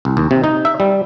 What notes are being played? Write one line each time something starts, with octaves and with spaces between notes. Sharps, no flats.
C2
D#2
C3
D#4
E5
G3